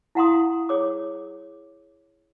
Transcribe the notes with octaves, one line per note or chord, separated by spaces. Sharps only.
E4 F5 F#5 A#5 C6 D#6
G#4 C#5 D6